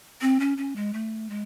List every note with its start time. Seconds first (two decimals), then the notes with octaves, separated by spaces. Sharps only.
0.21 C4
0.40 C#4
0.58 C#4
0.76 G#3
0.93 A3
1.30 G#3